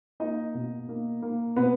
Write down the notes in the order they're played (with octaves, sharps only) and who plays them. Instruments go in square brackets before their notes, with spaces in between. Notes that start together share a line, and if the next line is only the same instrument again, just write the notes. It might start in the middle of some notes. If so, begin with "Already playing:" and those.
[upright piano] A#3 D#4 D#5
B2
A#3
A#3
B2 B3 B4